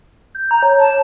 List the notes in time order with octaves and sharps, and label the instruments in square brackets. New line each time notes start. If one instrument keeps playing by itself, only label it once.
[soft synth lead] G6
A#5
C#5
[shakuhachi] A5